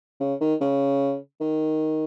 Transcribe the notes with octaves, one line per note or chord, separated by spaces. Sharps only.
C#3
D#3
C#3
D#3